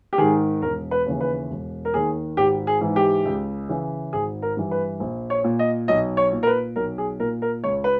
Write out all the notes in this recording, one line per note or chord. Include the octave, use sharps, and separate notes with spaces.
G4
G#2 D#3 G#4
E1 A#4
B4
D#2 C#3 E3
B4
E1
A#4
D#2 D#3 G#4
G#1 G4
G#4
G#2 E3
G4
C#2
C#3 E3
G#1 G#4
A#4
G2 E3
B4
A#1
C#5
A#2
D#5
B1 D#5
C#5
A#2
A#4
B4
B1 A#4
G#4
A#2 A#4
A#4
C#2 C#5
B4